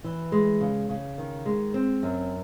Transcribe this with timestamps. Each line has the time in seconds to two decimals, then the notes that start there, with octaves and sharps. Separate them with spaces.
0.04 E3
0.32 G#3
0.61 C#3
0.89 C#3
1.18 D#3
1.46 G#3
1.74 C4
2.03 F#2